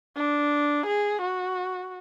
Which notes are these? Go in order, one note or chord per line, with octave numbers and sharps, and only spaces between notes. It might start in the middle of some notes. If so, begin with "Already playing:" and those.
D4
G#4
F#4